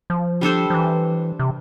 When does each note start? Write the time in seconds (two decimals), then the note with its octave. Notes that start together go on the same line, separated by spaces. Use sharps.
0.10 F3
0.41 G3 D4 A4 C5
0.70 F3
0.74 E3
1.39 C3